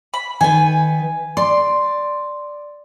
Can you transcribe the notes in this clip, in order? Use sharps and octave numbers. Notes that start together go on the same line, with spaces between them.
B5
D#3 B4 G#5
D5 C6